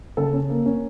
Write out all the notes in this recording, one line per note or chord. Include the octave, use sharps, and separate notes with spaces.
C#3 A4 A5
C#4
A#3
C#4